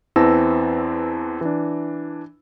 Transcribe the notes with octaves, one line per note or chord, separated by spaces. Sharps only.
E2 E3 C4 A5 E6 A#6
E3 D4